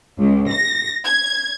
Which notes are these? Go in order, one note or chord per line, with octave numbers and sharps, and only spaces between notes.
C#2
A#6
G#6